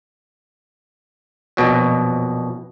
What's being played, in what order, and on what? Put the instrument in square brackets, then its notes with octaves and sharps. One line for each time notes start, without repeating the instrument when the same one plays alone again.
[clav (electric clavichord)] A#1 F2 B2 F#3